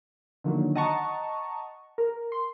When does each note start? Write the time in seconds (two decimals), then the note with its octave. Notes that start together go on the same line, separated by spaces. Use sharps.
0.44 D3 D#3 F3 F#3 A#3
0.75 D#5 F#5 A5 A#5 C#6
1.98 A#4
2.32 C6